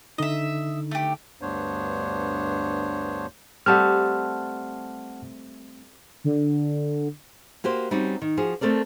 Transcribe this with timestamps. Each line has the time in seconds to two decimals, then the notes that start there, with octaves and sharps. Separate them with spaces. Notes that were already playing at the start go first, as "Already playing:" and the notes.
0.18 D3 D#4 D#5 E5
0.91 A3 G4
1.42 D2 G2 B3 D4 C5 C#5
3.66 G3 A3 C4 F#5 A5 F6
6.24 D3
7.64 A#3 F#4 G4 C5
7.91 G3 C4 C#4 D#4 F#4 G4
8.22 D#3
8.37 F3 F#4 G#4
8.61 A3 C4 A4 A#4 D5